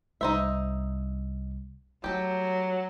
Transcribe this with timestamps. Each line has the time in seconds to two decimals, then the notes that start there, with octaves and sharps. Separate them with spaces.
0.21 C2 D#4 C5 E5
2.04 F#3 A3 G4 A4